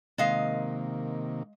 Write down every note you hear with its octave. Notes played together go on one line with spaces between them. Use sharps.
C3 D#3 G#3 A#3 D#5 F5